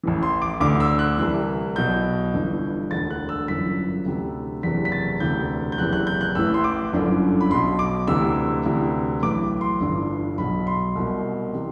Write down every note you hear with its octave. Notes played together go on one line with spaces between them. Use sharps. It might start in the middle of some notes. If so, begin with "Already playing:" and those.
A1 A2 E3
C6
D6
D2 D3 D6
E6
F#6
C2 C3 E3
B1 B2 G6
G1 G2 E3
E1 D2 D3 A6
F#6
E6
G1 F#2 E3 B6
D2 C3 E3
F#1 E2 C3 E3 B6
B6
A6
E1 D2 C3 E3 G6
G6
F#1 E2 C3 E3 F#6
F#6
G6
F#6
A1 A2 E3 E6
C6
D6
G1 F#2 D3
B5
B1 B2 C6
D6
D2 C3 E3 E6
D2 C3 E3
B1 A2 E3 D6
C6
G1 G2 E3
B1 B2 B5
C6
C2 B2
C3 E3